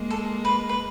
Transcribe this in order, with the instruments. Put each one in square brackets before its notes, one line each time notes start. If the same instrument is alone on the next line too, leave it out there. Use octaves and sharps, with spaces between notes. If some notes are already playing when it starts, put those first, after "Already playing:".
Already playing: [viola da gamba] G#3 A#3
[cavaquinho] A4
B4
B4